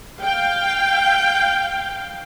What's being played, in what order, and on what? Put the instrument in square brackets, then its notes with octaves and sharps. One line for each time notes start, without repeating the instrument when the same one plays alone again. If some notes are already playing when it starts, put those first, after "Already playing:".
[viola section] F5 G5